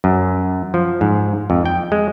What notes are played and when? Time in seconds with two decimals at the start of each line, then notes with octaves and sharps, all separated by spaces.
0.04 F#2
0.74 F3
1.01 G#2
1.50 F2
1.66 G5
1.92 G#3